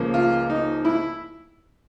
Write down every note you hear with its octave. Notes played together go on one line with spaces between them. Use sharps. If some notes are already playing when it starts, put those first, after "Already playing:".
Already playing: C#2 C#3 F3 A#3 C#4
F4
D#4
E4